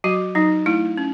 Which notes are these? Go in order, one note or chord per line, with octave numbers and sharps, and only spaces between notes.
F#3 F#4
F#3 D#4
A3 E4
C#4